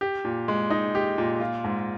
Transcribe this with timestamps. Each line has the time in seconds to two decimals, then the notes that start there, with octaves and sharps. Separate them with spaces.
0.01 G4
0.25 A#2
0.48 G#3
0.70 D#4
0.95 G4
1.18 A#2
1.40 F4
1.64 G#2